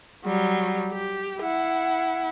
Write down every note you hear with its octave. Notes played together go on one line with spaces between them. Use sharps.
F#3 G3
G4
E4 F#5